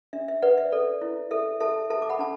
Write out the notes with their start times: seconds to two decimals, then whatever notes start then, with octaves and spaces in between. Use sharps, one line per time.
0.13 D4 E5
0.28 E5
0.42 B4 D5 F#5
0.57 E5
0.72 A4 D5
1.01 E4
1.31 A4 E5
1.60 A4 E5 A5
1.90 A4 E5 A5
2.02 D6
2.09 F#5 B5
2.19 D4 A5